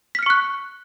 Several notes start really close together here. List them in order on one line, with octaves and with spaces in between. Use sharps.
B6 F6 C#7 C#6 F#6